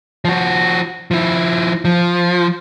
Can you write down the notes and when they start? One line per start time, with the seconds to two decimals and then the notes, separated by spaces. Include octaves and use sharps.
0.25 F3 F#4
1.11 F3 E4
1.85 F3